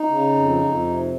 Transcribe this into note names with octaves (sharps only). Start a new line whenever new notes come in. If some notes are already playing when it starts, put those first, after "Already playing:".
Already playing: D#4
C#3
F2
F2
C3